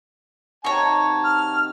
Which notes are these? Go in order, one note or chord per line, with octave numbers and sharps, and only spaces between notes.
C3 D#3 F#4 C#5 A5
F6